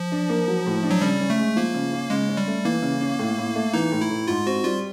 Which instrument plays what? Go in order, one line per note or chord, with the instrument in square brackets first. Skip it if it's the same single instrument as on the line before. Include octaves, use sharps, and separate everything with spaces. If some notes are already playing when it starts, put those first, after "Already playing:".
Already playing: [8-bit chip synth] F3
[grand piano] D4
A#3
F#3
A2
D4
[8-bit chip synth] F#3
[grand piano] C#3 [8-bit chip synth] G3
[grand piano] C#4
[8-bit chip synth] A3
[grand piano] G#3
[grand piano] F3 [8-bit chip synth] A#3
[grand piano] C#3
C#4
[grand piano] C#3 [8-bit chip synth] G#3
[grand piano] C#4
[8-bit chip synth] G3
[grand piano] A3
[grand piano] E3 [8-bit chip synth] A#3
[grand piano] C#3
C#4
A2
A2
A3
[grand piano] E3 [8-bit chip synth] D#4
[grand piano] A2
[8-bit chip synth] E4
[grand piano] A2
[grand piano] G#2 [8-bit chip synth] F4
[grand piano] C4 [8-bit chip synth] F#4
[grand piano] G3 [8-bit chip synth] F4